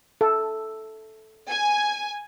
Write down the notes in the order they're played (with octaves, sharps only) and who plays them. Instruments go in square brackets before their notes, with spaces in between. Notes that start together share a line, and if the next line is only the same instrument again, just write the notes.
[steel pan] A4
[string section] G#5